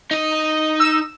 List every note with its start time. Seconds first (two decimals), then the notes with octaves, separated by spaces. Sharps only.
0.11 D#4 D#5
0.80 E6 E7